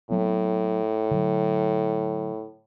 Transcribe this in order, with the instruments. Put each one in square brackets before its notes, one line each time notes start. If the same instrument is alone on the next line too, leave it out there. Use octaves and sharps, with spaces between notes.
[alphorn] A2 [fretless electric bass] F#3 B3 C4
[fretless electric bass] D3 F#3